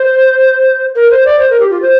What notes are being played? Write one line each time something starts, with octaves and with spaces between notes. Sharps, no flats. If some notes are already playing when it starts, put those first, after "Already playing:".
Already playing: C5
A#4
C5
D5
C5
A#4
G4
F4
C5